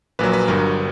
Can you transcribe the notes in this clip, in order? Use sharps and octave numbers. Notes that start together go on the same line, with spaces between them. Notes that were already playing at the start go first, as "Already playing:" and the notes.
A#1 A#2 F#3 B4
B4
G1 G2 F#3 A#4